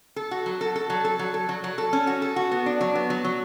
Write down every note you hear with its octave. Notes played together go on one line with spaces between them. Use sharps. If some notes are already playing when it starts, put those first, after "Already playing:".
A4
F#4
F#3
A4
A4
F#3
A4
F#3
A4
F#3
F#3
A4
C#4
F#4
A4
F#4
B3
D4
F#3
B3
F#3
F#3